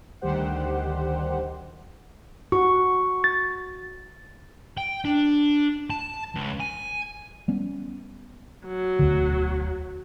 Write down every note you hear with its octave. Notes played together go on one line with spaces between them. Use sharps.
D2 D#3 G3 G4 C5 F#5
F#4 C#6
A6
G5
D4
A5
C#2
G#5
G3 B3 C#4
F#3
E1 D2 D3